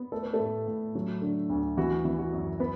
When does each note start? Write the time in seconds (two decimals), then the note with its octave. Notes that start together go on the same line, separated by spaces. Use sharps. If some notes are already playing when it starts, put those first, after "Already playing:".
Already playing: B3
0.12 A3 A4
0.23 B4
0.33 A3 A4
0.40 A2
0.67 A2
0.95 F#3
1.22 D3
1.50 D2
1.77 E3 F#4
2.05 E3
2.19 F#4
2.33 F#2
2.60 B3 B4